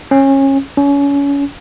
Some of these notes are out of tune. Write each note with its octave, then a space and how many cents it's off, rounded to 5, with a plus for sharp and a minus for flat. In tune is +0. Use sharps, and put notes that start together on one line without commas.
C#4 -25
C#4 +30